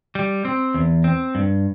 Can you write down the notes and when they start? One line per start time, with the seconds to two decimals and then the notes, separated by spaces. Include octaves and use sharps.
0.15 G3
0.45 C4
0.74 E2
1.04 C4
1.35 G2